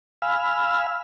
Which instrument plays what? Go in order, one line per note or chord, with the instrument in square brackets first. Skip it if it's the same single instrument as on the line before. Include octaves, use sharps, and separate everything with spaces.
[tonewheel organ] F5 G#5 B5 E6 F6